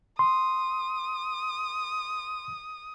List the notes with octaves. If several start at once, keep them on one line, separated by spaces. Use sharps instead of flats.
C6 D#6